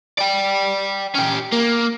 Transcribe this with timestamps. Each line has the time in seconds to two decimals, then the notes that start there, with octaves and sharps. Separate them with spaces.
0.19 D5 G5
1.15 C#4 G4
1.52 A#3